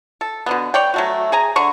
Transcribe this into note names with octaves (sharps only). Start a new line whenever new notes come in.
A4
B2 D3 B3
C#5 D5 G5
F#3 A3 F#4
G#4 G#5 A#5
D3 C#6